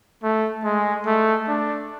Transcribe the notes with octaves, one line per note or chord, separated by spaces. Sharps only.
A3
G#3
A3
D4